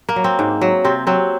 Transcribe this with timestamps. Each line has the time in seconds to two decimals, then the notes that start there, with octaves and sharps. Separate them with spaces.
0.09 A#3
0.16 F#3
0.24 C4
0.39 G#2
0.61 F#3
0.84 C3 C4
1.07 F#3 C4